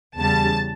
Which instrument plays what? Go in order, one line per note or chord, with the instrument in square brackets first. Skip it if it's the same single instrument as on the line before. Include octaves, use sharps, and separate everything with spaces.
[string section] E2 C#3 G3 A5